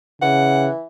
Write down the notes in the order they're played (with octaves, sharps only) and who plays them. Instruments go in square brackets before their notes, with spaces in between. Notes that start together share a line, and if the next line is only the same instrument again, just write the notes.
[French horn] C#3 [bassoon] E3 [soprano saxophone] F#5